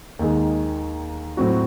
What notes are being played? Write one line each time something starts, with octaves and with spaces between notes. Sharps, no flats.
D#2 D#3 G#3
A2 F#3 C4 F#4